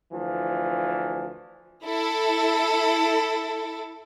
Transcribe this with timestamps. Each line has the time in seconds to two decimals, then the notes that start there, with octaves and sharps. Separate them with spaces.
0.12 D2 E3 F3
1.84 E4 A4